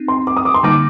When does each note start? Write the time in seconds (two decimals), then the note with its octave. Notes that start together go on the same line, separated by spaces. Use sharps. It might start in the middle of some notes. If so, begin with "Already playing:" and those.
Already playing: C4 D#4
0.08 C6
0.27 D6
0.37 D#6
0.45 D6
0.54 C6
0.63 D3 G3 A#3 D#4 D6